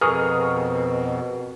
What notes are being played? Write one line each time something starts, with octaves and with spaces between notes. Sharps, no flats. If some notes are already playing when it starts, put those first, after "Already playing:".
F2 B2 G#4 A#4 B4 C#6 D#6 F6